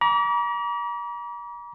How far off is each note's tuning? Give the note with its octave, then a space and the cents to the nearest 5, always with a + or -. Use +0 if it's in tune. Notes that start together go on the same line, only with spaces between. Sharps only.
A#5 +40 D6 -35